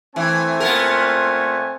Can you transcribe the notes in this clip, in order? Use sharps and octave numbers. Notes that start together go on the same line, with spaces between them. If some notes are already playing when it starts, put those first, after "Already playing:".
E3 A3 C4 G#5
A#2 B3 A#4